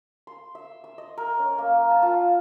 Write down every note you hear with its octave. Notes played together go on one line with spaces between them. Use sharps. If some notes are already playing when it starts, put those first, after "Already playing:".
C6
E5
E6
D#5
A#4
C#4
A#3
A5
F4